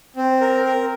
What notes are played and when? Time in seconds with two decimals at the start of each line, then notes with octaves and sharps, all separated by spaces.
0.16 C4
0.41 A#4
0.65 A#4